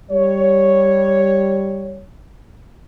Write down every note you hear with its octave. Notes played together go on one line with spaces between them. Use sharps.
G3 C#5